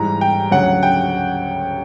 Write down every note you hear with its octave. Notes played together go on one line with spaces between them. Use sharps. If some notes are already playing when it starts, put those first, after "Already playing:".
Already playing: G#2 E3 G3 A#5
G5
D2 C#3 F#3 F#5
G5